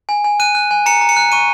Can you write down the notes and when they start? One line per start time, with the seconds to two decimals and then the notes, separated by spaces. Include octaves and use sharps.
0.09 G#5
0.24 G#5
0.40 F#6 D#7
0.55 F#6
0.71 G#5
0.86 A#5 C#7
1.01 A#5
1.09 C#7
1.16 F#6
1.32 C#6 D#7